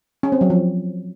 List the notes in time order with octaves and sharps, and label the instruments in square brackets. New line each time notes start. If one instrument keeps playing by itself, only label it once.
[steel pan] C#4
C4
F#3
F3